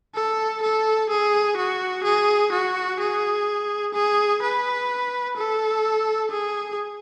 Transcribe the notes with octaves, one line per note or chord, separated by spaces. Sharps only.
A4
A4
G#4
F#4
G#4
F#4
G#4
G#4
B4
A4
G#4